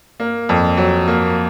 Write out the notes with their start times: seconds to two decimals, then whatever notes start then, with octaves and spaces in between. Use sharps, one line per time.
0.20 A#3
0.49 F2
0.77 F#3
1.08 A#3